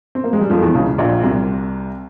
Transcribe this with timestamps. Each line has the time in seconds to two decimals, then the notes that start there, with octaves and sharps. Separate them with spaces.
0.15 C4
0.24 A#3
0.33 G#3
0.41 G3
0.50 F2 F3
0.62 E2 E3
0.74 C#2 C#3
0.98 A#1 A#2
1.23 C2 C3